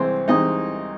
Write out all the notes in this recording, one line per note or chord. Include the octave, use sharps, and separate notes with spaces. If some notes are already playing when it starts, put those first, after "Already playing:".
Already playing: C2 C3 E3 G#3 C4
C2 C3 E3 G#3 D#4 D#5